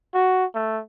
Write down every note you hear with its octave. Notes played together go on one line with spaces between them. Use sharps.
F#4
A3